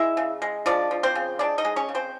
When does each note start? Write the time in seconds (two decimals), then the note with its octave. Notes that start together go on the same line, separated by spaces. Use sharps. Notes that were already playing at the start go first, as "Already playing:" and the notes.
Already playing: G#3 E4 E5
0.17 C#3
0.42 G#3
0.66 F3 D4 D5
0.91 F3
1.03 C4 C5
1.15 C#3
1.39 G#3 D4 D5
1.58 D#4 D#5
1.65 G#3
1.76 C#4 C#5
1.89 C#3
1.95 C4 C5